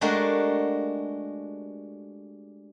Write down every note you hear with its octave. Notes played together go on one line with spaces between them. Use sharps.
G#3 A3 D4 F#4 G4 A#4